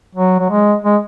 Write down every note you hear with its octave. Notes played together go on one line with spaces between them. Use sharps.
F#3
F#3
G#3
G#3